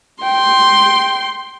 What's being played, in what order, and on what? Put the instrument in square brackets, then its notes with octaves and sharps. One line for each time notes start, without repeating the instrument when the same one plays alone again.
[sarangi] G5 [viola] C6